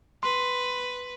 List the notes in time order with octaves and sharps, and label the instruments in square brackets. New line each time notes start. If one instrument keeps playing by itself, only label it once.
[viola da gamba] B4 [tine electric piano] C6